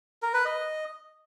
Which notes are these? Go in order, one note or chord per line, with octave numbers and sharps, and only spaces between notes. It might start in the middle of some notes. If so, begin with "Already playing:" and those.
A#4
B4
D#5